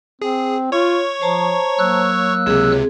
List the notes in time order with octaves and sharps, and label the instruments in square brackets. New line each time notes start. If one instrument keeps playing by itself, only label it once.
[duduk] C4 [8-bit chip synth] G#4
[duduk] F4 [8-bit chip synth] C#5 C#6
[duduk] F3 [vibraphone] C5 A5 A#5
[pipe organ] F#3 E6 F#6 [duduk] A#3
[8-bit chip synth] C#2 C3 [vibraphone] C4 G#4